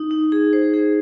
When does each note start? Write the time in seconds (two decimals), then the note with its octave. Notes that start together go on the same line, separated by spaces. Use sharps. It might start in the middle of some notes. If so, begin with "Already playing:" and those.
Already playing: D#4
0.11 D#4
0.32 G#4
0.53 C5
0.74 G#4